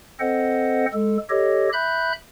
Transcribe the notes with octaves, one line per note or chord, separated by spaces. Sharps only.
C4 A4 C5 D#5 F#5
G#3 A4
G4 A4 C#5 D#5
E5 B5 F#6 G6